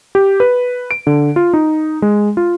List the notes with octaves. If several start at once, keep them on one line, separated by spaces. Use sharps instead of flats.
G4
B4
D7
D3
F4
D#4
G#3
F4